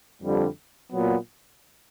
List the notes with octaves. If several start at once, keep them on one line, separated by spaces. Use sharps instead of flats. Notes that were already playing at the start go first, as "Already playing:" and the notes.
F2 D3 G3
A#2 F#3 B3